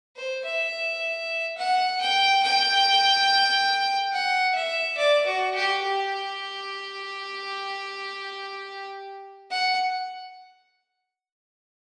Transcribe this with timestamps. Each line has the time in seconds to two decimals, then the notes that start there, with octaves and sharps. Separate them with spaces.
0.16 C5
0.44 E5
1.58 F#5
2.01 G5
2.43 G5
4.12 F#5
4.55 E5
4.97 D5
5.26 F#4
5.55 G4
5.82 G4
9.50 F#5